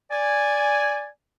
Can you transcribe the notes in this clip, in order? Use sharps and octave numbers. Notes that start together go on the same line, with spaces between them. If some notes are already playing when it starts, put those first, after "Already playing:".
D5 G#5